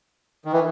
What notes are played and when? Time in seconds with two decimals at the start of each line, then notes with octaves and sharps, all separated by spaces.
0.45 D#3
0.52 E3